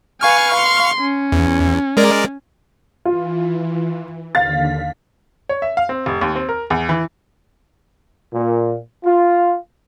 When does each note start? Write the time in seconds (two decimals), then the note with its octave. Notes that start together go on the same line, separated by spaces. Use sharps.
0.21 B4 F5 G#5 C#6 F6
0.57 C6
1.00 C#4
1.32 E2
1.97 G#3 A#4 D5
3.05 E3 F4
4.35 D#2 D3 F5 A6 B6
5.49 C#5
5.62 E5
5.77 F5
5.89 C4
6.06 F1
6.21 D#2
6.35 C4
6.49 A#4
6.70 E2
6.89 E3
8.33 A#2
9.04 F4